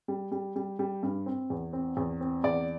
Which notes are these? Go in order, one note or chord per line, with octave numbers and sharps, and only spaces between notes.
G3
G3
G3
G3
G2
C4
E2
C4
E2
C4
E2 D5